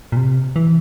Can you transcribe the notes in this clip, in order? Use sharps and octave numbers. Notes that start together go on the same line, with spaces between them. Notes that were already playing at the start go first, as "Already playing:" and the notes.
A#2
C3
E3